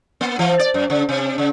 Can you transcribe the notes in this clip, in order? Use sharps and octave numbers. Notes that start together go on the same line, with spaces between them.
A#3
E3
D5
F#2
C#3
C3
C#3